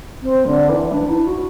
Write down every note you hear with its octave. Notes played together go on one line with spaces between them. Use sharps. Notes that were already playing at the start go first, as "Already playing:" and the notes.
C4
D3
E3
D4
E4
F#4